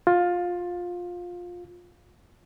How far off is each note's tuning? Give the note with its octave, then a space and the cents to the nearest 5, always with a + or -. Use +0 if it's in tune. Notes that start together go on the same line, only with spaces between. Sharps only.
F4 +15